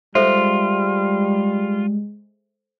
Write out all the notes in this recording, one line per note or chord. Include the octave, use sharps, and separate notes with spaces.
G3 G#3 F4 A4 C5 E5